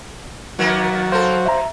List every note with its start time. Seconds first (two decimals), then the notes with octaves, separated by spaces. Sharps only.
0.59 D#3 F#3 A#3 B3
1.12 A#3 A4 C5 F5
1.46 B2 E5 A#5